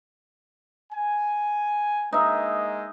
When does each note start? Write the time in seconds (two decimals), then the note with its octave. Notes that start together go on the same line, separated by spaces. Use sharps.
0.92 G#5
2.13 G#3 A#3 D#4 D#5 E5